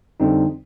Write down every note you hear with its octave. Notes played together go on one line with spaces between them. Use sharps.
F2 D3 G3 C4 D#4